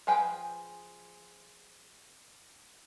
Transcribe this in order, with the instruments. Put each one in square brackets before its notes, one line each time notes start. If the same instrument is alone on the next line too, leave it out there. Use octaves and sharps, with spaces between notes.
[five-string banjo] F3 G#4 B4 G5